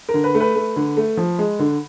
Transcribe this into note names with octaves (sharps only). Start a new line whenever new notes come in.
A#4
D3
B4
A3
B4
A3
D3
A3
F3
G#3
D3